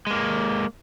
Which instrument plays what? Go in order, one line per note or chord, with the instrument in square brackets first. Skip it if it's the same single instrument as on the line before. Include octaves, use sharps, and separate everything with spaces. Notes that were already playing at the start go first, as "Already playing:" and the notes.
[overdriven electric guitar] G#3 A#3